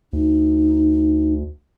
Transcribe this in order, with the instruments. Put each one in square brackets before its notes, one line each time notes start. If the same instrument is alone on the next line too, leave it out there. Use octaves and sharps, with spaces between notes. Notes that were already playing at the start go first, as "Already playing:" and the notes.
[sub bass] D2 [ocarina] D#4